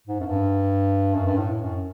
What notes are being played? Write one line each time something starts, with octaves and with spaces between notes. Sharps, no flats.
G#2
F#2
G2
F#2
G2
A2
F#2